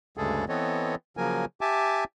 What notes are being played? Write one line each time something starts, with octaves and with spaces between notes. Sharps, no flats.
D2 G2 C#3 G#3 G#4 A4
E3 B3 C4 A4 C#5 D#5
C#3 F3 F#3 A#3 A#4 G#5
G4 E5 G#5 A5 D6